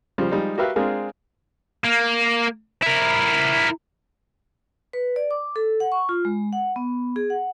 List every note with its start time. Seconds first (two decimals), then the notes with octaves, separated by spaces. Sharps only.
0.18 C#3 F3 G3
0.31 F3 G3 G#3 D#4
0.58 F#4 G4 A#4 B4 E5 F5
0.76 G#3 C4 D4 F4 G#4 A#4
1.85 A#3
2.83 E4 A#4
4.93 B4
5.16 D5
5.31 D6
5.56 A4
5.80 F#5
5.92 C#6
6.09 F4
6.25 G#3
6.53 F#5
6.76 B3
7.16 G#4
7.30 F#5